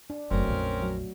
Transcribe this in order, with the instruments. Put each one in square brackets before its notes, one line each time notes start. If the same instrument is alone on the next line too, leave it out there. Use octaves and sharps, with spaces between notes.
[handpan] D4
[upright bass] F#1 E4 [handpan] F#3 A3 [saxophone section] C4 C#4 A#4
[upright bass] A#1 F2
[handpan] F#3